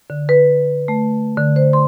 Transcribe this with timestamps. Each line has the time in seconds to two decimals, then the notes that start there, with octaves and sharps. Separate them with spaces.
0.10 D3
0.29 B4
0.88 A3
1.37 D3
1.56 C5
1.73 C6